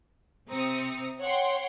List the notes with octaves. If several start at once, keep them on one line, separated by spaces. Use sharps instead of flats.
C3 C4 A#5 D#6 C#7
C#5 F#5 G5 C6